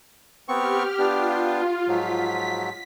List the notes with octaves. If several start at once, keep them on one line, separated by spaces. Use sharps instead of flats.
B3 C4 G4 C#6 F6
B3 D4 F4 G4
G#2 F3 F#3 B6